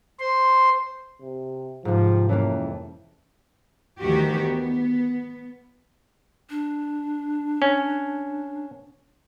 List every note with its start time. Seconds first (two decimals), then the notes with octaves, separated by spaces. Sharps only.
0.20 C5 C6
1.22 C3
1.85 G#2 C3 F3
2.29 F2 E3 A#3 C#4
4.00 D2 D#3 E3 G3 F#4 G4
4.37 B3
6.50 D4
7.62 C#4